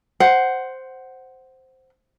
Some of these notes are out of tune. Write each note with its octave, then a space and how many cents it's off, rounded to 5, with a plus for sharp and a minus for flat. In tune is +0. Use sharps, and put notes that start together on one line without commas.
C5 +0 F#5 +10